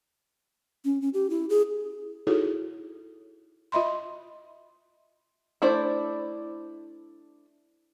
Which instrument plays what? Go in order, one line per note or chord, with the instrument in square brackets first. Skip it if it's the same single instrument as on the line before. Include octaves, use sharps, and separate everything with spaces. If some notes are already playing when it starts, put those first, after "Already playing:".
[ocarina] C#4
C#4
G4
E4
G#4
[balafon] D#4 E4 F#4 G#4 A4 C#5
F4 D#5 E5 B5 C6
[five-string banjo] A3 D4 E4 C5 D5